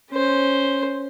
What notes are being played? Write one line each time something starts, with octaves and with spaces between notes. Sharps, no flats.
C#4 C5